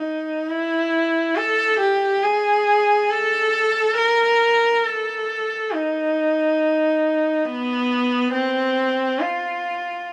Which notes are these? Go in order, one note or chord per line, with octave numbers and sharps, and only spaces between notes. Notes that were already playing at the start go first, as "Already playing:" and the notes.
Already playing: D#4
E4
A4
G4
G#4
A4
A#4
A4
D#4
B3
C4
F4